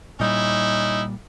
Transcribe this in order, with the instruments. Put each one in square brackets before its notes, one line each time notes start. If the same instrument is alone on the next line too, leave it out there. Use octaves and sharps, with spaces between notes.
[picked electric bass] A#2 G3 [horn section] C#4 D#4 E4